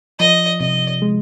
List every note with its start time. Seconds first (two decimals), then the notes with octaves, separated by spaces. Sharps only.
0.19 F3 D#5
0.60 C3 D#5
1.02 G#3